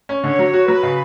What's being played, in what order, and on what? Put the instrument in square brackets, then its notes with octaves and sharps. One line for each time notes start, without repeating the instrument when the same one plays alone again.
[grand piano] C#4
[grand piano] D3 [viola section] C#5
[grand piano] F#3
F#4
[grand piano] F#3 [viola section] B4
[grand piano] C#3